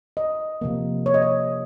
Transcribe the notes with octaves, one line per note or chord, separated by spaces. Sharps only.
D#5
C3 F3 A#3
C#5
D#5
C#5